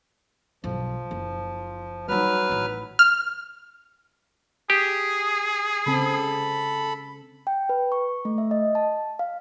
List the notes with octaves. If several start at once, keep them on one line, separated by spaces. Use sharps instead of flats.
B1 G2 F3
F#1
F#3 G3 D#4 B4 F6
A1 D#4
F6
G4 G#4
C#3 C4 A4 B5
G5
B4
C#6
A3
E5
D#5
A5
F5